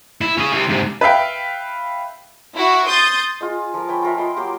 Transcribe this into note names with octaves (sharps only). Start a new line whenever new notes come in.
E4
C#4 G#4
C3 E4
G#2 C3
B4 E5 F5 G5
E4 F#4
C6 D#6 G6 A6
F4 G#4 D#5
F3 A#4
C#5 G5 G#5 B5
F4 A#4 E5
D#5 B5 C6
F#3 A#3 G4 C6